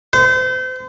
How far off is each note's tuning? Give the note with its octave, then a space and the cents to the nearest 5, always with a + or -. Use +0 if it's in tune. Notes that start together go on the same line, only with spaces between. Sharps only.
C5 -35